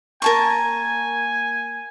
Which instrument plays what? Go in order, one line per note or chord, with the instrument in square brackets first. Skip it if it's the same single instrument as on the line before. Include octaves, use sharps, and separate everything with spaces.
[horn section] A#3 G#5 [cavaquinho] A#4 A5 C#6